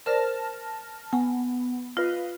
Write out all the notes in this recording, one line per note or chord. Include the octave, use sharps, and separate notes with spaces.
A#4 C5 D5 A5 F6 A#6
B3 G#5
F4 B4 D#5 F5